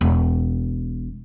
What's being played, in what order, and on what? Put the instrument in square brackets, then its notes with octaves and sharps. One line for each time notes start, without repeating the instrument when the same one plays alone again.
[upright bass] E1